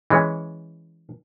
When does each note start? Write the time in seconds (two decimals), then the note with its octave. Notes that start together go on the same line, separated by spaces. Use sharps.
0.10 E3 G#3 C#4